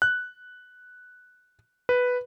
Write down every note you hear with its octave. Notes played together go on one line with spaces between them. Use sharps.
F#6
B4